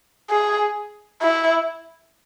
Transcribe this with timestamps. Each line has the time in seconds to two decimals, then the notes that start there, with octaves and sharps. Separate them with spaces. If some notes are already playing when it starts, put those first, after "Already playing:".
0.30 G#4
1.22 E4